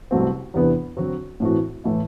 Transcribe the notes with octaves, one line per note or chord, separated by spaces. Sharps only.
C2 B2 F#3 A3 C4
E2 C3 E3 B3 D4
D3 F#3 C4 F#4
A2 E3 A3 C4 F#4
A2 E3 A3 E4